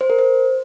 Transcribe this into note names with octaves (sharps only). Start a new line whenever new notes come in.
C5
A#4
C5